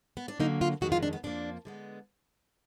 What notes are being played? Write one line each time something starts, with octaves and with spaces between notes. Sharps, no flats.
B3
D4
D3 F#3 A#3 D#4
F4
F2 D#3 G#3 B3 F#4
F4
D4
B3
F2 F3 A#3 D4
D3 G#3 B3